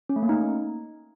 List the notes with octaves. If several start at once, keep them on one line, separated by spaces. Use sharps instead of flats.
C#4
A3
A#3
D#4